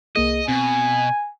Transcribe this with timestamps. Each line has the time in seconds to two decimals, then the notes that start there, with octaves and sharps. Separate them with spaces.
0.16 C2 A#3 G#4 D#5
0.48 B2 C4 G#5